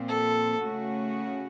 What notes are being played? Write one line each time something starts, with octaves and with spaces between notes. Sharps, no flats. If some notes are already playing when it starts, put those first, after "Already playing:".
Already playing: A#2 F3 C4
A4
C#3 A3 C#4 F#4